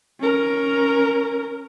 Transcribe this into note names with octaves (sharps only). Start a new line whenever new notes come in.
C#4 A#4